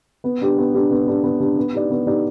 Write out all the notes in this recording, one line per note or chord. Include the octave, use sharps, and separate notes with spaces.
B3
D4 G4
B3
D4 G4
B3
D4 G4
B3
D4 G4
B3
D#4 G4 D5
B3
D#4 G4 D5